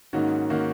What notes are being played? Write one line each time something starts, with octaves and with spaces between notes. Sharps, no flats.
G#2 D#3 A#3 C#4 F#4
D#3 A#3 C#4 F#4